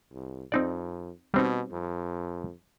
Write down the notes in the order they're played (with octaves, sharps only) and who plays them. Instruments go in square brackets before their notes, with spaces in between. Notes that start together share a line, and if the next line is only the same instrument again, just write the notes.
[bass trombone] C2
[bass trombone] F2 [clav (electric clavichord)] C4 D#4 D5
[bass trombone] B2 [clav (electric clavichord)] G3 C4 D#4
[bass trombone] F2